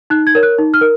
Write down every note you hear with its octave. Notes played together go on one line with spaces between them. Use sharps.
D#4 F#6
G#6
A#4 C#5
F#6
D#4
F6
A#4